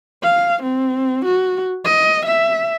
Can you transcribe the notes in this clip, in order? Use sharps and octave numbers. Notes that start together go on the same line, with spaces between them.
F5
C4
F#4
D#5
E5